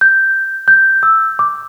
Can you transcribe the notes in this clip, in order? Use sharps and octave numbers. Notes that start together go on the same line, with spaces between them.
G6
G6
E6
D6